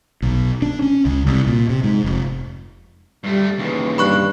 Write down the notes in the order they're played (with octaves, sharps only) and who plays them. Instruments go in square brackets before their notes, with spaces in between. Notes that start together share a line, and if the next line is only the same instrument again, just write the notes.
[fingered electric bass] B1
D4
C#4
C#2
C2
A#2
C3
G#2
F1
[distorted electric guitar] G2 A3 [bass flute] G3
[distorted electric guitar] D#2 C#3 [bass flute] E3
[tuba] G2 [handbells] B5 C#6 F#6